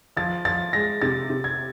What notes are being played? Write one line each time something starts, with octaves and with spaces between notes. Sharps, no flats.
F3 A6
F3 A6
G#3 A#6
C3 A6
C3
G#6